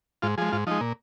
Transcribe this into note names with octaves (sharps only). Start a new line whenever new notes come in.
G#2 F4
F3 G#3 G#4
G#2 F4
F3 G#3 D#4
A#2